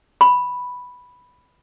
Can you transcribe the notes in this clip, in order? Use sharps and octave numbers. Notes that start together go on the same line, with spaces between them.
B5